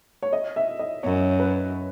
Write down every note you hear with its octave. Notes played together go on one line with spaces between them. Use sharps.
C#5
D#5
E5
D#5
F#2 C#5
B4